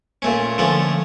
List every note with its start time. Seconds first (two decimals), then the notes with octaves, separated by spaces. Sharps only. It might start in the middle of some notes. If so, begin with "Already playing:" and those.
0.22 A#2 A3 C#4
0.58 D3 F3 A3 C#4